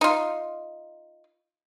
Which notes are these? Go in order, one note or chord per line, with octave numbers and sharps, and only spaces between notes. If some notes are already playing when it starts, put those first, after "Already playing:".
D#4 F4